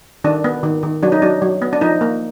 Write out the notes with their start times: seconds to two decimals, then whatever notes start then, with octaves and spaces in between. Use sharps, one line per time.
0.24 D#3 D4
0.44 B3
0.63 D#3
0.83 D#3
1.03 F#3 D4
1.12 D#4
1.22 F#3 D4
1.42 F#3
1.62 B3
1.73 D4
1.81 F3 D#4
2.01 A#3